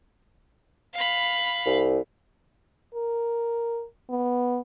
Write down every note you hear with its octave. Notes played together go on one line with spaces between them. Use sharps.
F5 B5
C2
A#4
B3